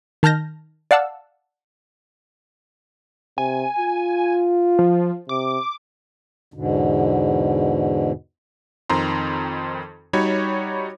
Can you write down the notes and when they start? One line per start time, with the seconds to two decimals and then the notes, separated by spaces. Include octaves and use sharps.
0.23 D#3 A5 F6 G6 A#6
0.91 D5 F5 F#5 A5 E6
3.38 C3 G#5
3.79 F4
4.79 F3
5.29 C3 D6
6.54 E2 G#2 B2 D3
8.90 F2 D#3 C4 A#5 C6
10.13 G3 D#4 F#4 C#5 B5 G#6